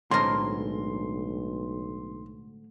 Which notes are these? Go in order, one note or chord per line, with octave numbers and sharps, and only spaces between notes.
B1 A2 D3 G#3 C4 A#4 C6